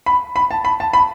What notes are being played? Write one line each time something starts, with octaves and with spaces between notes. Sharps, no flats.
B5
B5
A5
B5
A5
B5